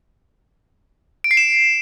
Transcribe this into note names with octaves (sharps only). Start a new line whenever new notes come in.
D7
C7
E7